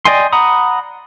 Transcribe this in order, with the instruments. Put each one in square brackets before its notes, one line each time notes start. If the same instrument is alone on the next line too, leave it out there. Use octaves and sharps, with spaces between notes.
[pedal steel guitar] D5 D#5 G5 G#5 C6
F#5 A#5 B5 D#6